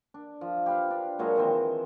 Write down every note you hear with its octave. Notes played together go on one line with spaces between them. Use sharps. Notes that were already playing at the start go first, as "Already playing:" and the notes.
D4
F3
G4 B4 F5
D4
A#2 F#3 G#3 C#5
D#3 E3 C4